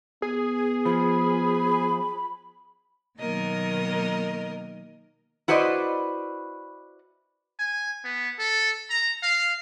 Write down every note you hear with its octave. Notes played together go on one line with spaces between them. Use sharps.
B3 G#4
F3 B5
B2 D#3 F#3 A#3 A#4 D#5
E4 F#4 B4 C5 D5 D#5
G#5
B3
A4
A#5
F5